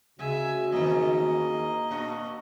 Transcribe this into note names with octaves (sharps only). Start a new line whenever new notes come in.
D2 C#3 G#3 C#4 F#4 E5 G#5
E2 G#2 D#3 A#3 D#5
A#2 D4 F#4